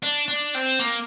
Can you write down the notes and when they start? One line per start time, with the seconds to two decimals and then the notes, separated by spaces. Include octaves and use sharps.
0.03 D4
0.28 D4
0.55 C4
0.79 A#3